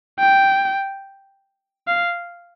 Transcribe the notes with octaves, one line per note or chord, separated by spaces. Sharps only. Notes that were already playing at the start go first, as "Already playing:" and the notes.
G5
F5